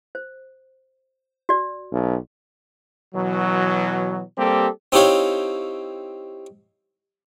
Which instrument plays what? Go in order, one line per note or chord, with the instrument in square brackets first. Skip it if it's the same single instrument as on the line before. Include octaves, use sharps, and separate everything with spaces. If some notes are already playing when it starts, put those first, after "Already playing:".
[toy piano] C5
F#4 D5
[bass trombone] B1
[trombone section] B2 E3 F#3
G3 A#3 C4 G4 A4
[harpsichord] C4 D#4 E4 G4 C#5 F5